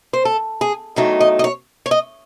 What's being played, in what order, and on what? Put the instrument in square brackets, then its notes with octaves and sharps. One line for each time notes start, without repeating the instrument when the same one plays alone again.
[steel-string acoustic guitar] C5
A4
G#4
E2 D#3 F#3 A3 D#4
D#5
D#5
C#5
C#5
D#5